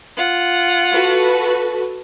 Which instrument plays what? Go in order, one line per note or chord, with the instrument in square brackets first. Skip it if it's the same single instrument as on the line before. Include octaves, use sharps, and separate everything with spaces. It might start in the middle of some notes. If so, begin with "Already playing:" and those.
[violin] F4 F#5
[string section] F#4 A4 B4